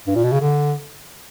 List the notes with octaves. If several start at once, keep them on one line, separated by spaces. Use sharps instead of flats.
G2
A#2
B2
C#3
D3